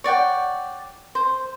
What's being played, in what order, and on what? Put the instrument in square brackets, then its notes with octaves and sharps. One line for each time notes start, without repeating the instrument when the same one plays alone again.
[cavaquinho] C#5 D5 F#5 G5
C5